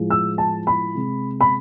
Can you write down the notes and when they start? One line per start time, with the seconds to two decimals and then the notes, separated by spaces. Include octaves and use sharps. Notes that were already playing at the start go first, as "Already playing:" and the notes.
Already playing: A2 F3 G#3
0.10 E6
0.38 A5
0.67 B5
0.95 C3 G#3
1.41 B5